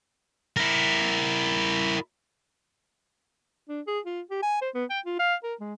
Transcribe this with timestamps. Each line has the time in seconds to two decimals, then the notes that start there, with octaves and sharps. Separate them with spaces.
0.57 E4 A#4
3.69 D4
3.87 G#4
4.06 F4
4.31 G4
4.42 G#5
4.61 C5
4.74 B3
4.90 G5
5.06 F4
5.19 F5
5.43 A#4
5.60 G#3